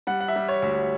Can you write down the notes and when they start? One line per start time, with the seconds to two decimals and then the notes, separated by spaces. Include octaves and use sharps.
0.07 G3 F#5
0.21 F#5
0.28 E5
0.36 G3
0.48 C#5
0.62 D2